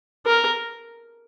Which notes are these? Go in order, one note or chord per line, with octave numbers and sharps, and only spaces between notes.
A#4